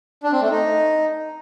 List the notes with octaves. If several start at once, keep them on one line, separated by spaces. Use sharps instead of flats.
D4
C4
A3
D#4